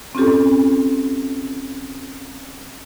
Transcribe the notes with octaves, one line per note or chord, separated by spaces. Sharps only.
C4 C#4 F4 G4 A4